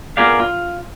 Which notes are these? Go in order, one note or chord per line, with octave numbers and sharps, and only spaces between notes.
B3 F4 G#4 A#4 D5 F5
F4